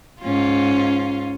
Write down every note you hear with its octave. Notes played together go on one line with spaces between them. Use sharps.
G#2 C#4 F4